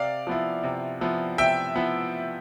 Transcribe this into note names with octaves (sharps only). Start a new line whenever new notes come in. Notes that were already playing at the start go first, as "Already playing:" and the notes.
Already playing: C3 D5 F5
F3 B3 E4
C3
F3 B3 E4
C3 E5 G5
F3 B3 E4